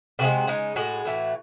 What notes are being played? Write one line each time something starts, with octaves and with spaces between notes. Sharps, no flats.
C3 E3 G#3 F#4
C#3 G#3 D#4
A2 G#3 F#4
A2 E3 A3